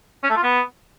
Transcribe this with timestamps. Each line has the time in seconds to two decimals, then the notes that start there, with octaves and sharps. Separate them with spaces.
0.23 C#4
0.30 A3
0.36 F4
0.43 B3